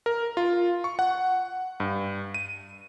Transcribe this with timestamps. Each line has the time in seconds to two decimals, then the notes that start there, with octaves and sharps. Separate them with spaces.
0.06 A#4
0.37 F4
0.84 C#6
0.99 F#5
1.80 G2
2.34 D#7